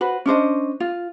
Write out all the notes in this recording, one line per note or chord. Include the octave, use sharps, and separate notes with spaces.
F#4 B4 C5
C#4 D4 C5 D#5
F4